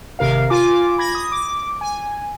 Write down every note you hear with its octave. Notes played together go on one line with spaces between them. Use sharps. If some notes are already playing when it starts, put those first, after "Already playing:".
G#1 C3 A#4 F5
F4 G#5 D6
B5 G#6 A#6
D#6
D6
G#5